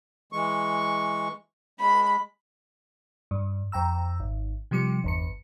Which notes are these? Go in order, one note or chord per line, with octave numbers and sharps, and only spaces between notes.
E3 G#3 C#6
G#3 B5
G2
F2 G5 A#5 E6
G#1
C3 F3 G3 D6 C#7
G1 E2 C#7